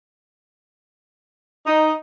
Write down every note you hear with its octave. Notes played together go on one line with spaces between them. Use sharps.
D#4